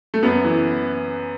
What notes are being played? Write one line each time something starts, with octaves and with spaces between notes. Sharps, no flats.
A3
F#2 B3
E3